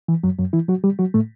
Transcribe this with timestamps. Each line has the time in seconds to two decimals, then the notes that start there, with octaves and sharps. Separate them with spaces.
0.08 E3
0.24 F#2 F#3
0.39 F#2 F#3
0.53 E3 E4
0.68 F#3 F#4
0.84 G3 G4
0.99 F#3 F#4
1.14 A2 A3